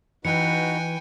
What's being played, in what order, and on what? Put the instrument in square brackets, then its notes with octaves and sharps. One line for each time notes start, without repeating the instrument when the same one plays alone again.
[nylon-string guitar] E3 [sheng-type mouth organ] D#4 F#4 B4 [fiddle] G5 G#5 [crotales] C#7